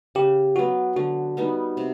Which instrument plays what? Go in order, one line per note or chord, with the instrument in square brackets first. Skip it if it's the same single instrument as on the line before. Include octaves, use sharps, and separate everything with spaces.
[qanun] C#3 [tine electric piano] G4
[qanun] F#3 B3 [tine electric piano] F#4
[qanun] D3 [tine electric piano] F#4
[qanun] G3 B3 D#4
C3